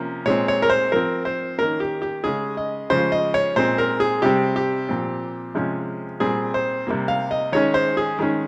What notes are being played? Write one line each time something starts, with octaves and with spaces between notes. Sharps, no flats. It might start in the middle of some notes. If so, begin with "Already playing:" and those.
Already playing: C3 F3 A#3 C#4
A#2 G#3 C4 C#5
C#5
A#4
C5
F3 C4 A#4
C5
D#3 A#3 C#4 A#4
G4
G4
C#3 G#3 C#4 G#4
D#5
C#3 F3 G#3 C5
D#5
C#5
A#2 G#3 C4 C5
A#4
G#4
C3 G3 C4 G4
G4
A#2 F3 C4
C3 F3 G#3 C#4
A#2 G3 C4 G#4
C5
C3 G3 A#3
F5
D#5
D#3 G#3 C#4 C#5
C5
G#4
D#3 G#3 C#4